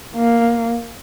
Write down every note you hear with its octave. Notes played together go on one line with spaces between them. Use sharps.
A#3